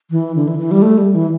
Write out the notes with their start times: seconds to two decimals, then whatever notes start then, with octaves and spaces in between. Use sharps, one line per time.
0.11 E3
0.36 D3
0.48 E3
0.59 E3
0.71 G3
0.82 A3
0.98 G3
1.15 E3